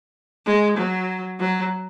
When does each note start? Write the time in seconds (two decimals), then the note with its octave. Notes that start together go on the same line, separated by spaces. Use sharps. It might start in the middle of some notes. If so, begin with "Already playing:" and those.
0.46 G#3
0.77 F#3
1.40 F#3